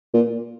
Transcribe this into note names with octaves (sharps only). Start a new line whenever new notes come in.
A#2